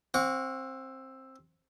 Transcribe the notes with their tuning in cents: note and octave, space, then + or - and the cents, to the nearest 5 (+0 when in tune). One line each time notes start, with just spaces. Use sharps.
C4 +15 F#5 -40 C#6 +35